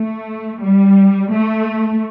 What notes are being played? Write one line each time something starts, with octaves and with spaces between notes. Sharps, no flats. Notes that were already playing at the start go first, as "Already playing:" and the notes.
Already playing: A3
G3
A3